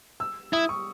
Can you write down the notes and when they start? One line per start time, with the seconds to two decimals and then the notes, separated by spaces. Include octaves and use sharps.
0.20 E6
0.53 E4 D#6
0.69 C#6